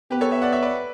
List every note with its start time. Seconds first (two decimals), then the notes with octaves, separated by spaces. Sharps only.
0.11 B3 G4 B4
0.21 A4 C#5
0.31 C#5 E5
0.42 D5 F#5
0.52 C#5 E5
0.62 B4 D5